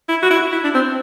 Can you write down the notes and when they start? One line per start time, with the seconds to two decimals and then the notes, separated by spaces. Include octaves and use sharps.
0.09 E4
0.22 F#4
0.30 E4
0.52 E4
0.64 D4
0.74 C4